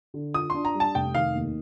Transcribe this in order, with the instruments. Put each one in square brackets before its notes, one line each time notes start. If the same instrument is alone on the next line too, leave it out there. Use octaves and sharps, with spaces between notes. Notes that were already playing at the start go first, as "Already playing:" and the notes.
[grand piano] D3
[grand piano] F4 [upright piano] D#6
[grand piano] D4 [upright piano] C6
[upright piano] A#5
[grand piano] G3
[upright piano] A5
[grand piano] F1 [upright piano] G5
[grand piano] D#3 [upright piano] F5
[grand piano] D#2